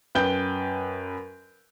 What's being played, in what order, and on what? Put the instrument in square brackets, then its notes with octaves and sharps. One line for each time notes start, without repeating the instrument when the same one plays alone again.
[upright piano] F#2 B4 G5 G6 G7